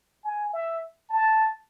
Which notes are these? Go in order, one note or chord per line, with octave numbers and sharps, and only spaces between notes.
G#5
E5
A5